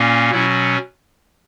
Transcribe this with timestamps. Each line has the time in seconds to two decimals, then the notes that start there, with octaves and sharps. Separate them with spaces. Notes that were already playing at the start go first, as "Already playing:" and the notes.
Already playing: A#2 A#3 C#4
0.30 B2 F#3 C#4 E4